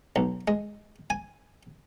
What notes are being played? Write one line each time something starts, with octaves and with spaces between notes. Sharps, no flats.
B1
G#3
G#5